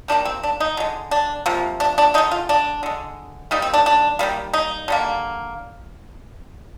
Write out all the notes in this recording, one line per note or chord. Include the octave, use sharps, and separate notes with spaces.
D#3 G3 A#3 D4
C4
D4
D#4
D3 G#3
D4
C3 F3 A#3
D4
D4
D3 G#3 D#4
F4
D4
D3 G#3
D#3 G3 A#3 D#4
C4
D4
D4
D#3 G3 A#3
D#4
D3 G3 A#3